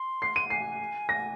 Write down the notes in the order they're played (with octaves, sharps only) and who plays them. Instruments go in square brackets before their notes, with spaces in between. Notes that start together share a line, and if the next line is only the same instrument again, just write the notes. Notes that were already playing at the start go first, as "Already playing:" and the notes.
Already playing: [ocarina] C6
[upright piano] C7
D#7
[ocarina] G#5 [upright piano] C7
[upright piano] A#6